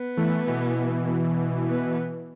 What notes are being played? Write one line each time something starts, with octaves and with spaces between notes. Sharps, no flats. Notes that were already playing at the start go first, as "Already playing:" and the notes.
Already playing: B3
E3 A3
B2 E3
B3